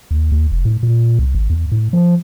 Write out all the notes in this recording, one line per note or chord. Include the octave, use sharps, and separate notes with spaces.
D#2
D#2
F1
A2
A#2
C2
G#1
E2
A2
F3